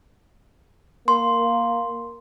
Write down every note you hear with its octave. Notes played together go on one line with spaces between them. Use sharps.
A#3 C6